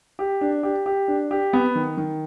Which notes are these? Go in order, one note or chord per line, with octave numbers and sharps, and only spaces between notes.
G4
D4
G4
G4
D4
G4
B3
D#3
D#3